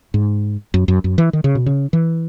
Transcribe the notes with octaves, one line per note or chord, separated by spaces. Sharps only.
G#2
F#2
F#2
F#2
E3
D#3
C#3
B2
C#3
E3